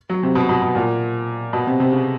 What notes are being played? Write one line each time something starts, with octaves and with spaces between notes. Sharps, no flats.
F#3
C3
B2
B2
B2
A#2
B2
C3
C3
C#3